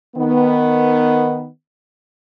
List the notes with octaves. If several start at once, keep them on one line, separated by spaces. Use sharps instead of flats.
D#3 B3